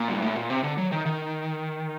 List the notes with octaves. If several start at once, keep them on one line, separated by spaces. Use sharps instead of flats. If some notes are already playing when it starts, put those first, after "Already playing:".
Already playing: A#2
G2
A2
A#2
C3
D3
F#3
D#3
D#3